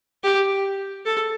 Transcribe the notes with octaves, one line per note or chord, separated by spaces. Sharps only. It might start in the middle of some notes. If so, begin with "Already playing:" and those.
G4
A4